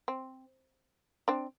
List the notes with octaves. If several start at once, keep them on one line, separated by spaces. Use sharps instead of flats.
C4
C4 D4